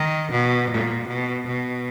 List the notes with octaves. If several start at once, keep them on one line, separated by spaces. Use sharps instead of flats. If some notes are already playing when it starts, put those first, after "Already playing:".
Already playing: D#3
B2
A#2
B2
B2